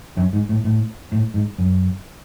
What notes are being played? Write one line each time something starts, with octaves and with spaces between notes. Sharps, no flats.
F#2
G#2
A2
A2
A2
G#2
F#2